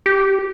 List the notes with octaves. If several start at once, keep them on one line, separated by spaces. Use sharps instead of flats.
G4